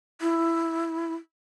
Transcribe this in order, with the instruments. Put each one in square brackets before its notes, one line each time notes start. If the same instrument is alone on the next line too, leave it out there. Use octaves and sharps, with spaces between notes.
[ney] E4